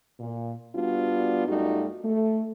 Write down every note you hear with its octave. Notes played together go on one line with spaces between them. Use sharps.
A#2
G3 B3 D4 F4 F#4
F#2 G3 A3 D#4 F4 F#4
A3